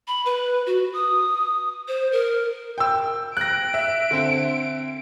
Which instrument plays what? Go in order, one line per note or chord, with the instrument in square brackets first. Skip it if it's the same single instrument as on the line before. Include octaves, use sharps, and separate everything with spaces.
[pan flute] B5
B4
F#4
D#6
C5
A#4
[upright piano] G5 E6
[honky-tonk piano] F#6 A#6 [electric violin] D7
[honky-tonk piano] E5
[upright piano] D3 C4